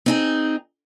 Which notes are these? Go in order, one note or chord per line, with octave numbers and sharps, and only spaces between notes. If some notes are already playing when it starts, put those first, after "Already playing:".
C4 D#4 G#4